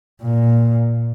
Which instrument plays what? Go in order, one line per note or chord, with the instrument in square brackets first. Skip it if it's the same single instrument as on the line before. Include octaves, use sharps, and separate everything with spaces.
[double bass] A#2